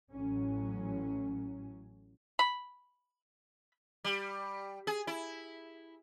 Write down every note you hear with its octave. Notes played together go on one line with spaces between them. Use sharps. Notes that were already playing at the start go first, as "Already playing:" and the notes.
A1 A2 F#3 C#4
B5
G3
G#4
E4